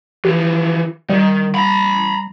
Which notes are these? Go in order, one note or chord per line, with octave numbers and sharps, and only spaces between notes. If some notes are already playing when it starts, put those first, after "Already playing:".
E3 F3 G4
D#3 G3
A#5 B5